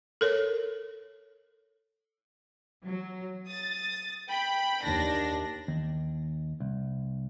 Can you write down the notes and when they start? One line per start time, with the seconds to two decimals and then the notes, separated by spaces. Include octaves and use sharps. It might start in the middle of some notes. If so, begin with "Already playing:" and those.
0.21 A4 A#4 C#5
2.85 F#3
3.46 D#6 A6
4.29 G5 B5
4.83 D#2 D4 A#6
5.68 D#2
6.60 C2